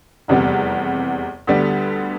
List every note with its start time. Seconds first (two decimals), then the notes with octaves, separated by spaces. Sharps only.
0.28 F1 E2 C3 G3 B3
1.47 D2 D3 G3 B3